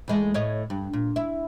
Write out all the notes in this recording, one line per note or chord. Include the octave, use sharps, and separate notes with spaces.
E2 G#3 A3
A2 C#5 D#5
G2
A#2
E4